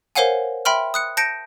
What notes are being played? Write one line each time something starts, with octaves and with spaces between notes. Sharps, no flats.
A#4 C5 C#5 F5 F#5 G#5
E5 G5 B5 C6 F6
D#6 F#6 C#7
A5 G6 A#6 C#7 D7